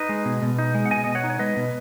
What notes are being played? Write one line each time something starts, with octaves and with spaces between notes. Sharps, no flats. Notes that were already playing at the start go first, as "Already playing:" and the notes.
Already playing: D#4 B4 D#5
G#3
B2
B2
D#4
G#3
F#5
B2 D#5 G#5
B2 D#5
C#5 F#5
D#4
C#5
G#3 B4 D#5
B2